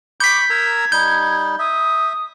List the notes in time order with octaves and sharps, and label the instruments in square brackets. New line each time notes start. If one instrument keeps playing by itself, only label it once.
[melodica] B5 C#6 [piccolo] D6 [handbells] G6 B6
[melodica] A#4 A#5 E6 [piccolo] G#6
[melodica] G3 D#4 [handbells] G6
[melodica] E5 [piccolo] D#6